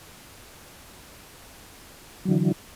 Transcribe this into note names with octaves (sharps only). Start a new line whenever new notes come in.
D3 E3 F#3